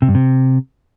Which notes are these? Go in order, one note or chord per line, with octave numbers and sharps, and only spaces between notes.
C3
G2
C3